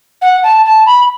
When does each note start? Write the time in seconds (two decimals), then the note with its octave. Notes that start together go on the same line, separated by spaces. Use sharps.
0.22 F#5
0.44 A5
0.65 A5
0.86 B5